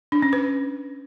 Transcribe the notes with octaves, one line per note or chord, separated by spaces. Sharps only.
D4
C#4
B4